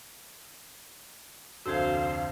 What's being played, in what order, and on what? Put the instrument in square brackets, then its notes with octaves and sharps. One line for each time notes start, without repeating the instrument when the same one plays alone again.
[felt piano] F1 D2 [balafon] F#4 A4 [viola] C5 F5